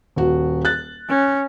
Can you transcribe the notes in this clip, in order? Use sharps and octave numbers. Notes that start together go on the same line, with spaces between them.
D#1 F#4
F#6 A6
C#4